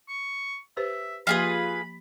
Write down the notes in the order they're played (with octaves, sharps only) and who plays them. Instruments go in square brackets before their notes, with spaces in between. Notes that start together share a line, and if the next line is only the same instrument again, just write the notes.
[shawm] C#6
[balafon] G4 B4 C5 [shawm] E5
[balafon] F3 A#3 G4 [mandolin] F4 G#4 B4 [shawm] B5